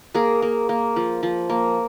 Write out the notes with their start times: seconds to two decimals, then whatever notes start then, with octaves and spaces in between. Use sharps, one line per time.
0.14 A#3 G#4 A#4
0.42 A#3
0.69 A#3
0.96 F3
1.23 F3
1.50 A#3